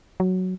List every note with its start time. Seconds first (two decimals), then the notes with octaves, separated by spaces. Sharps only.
0.20 F#3